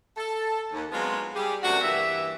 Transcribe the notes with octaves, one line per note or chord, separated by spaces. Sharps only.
A4
D#2
F#3 G#3 B3 C4 D4 F4
G3 G4 G#4
F#2 C3 A3 D4 F#4
G2 E3 A#3 G4 E5